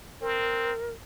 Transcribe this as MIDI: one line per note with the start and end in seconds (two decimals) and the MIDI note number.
0.21 0.71 60
0.21 0.92 70